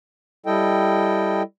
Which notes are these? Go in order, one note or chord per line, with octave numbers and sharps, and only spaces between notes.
G3 E4 A4 D#5 G5